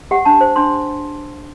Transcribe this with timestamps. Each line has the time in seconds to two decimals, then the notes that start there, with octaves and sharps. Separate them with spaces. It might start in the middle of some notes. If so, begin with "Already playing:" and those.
0.11 G4 F#5
0.25 D4 A5
0.41 C5
0.56 D4 C6